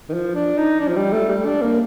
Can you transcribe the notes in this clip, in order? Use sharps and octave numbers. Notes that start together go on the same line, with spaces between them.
D#3
F3
D4
D#4
D4
F3
G3
A3
G3
D4
A#3